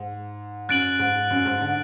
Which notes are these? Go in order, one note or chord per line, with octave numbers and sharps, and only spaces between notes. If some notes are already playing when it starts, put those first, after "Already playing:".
Already playing: G#2
F#2 F#6 A6 D7 F#7
G#2
F#2
G#2
D3